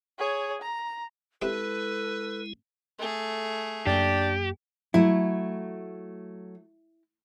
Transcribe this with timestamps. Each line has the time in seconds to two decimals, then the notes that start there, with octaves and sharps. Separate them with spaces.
0.19 G#4 C#5
0.62 A#5
1.42 G#3 C4 E4 G4 A4 B4 E5
2.99 A3 G#4
3.86 F#2 A#3 D4 G4
4.94 F#3 A3 E4